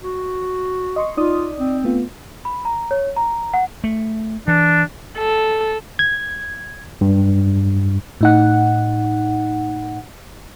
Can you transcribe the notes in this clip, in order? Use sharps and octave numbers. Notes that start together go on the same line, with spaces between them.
F#4
D#5 C6 C#6
D#4 F4 D5 D#6
C4
A3 B3 F4
B5
A#5
C#5
A#5
F#5
A3
E3 D4
A4
G#6
G2
A2 D#4 F#5